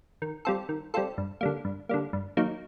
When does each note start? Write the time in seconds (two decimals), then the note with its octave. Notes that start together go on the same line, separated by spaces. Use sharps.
0.22 D#3
0.45 G3 C4 F4 A4
0.69 D#3
0.94 G3 C4 F4 A4
1.18 G2
1.41 D3 G3 A#3
1.65 G2
1.89 D3 G3 A#3
2.13 G2
2.37 D#3 F#3 A#3 D#4